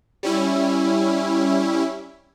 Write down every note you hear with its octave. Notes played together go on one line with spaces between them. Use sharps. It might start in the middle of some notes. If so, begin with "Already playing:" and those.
G3 C#4 E4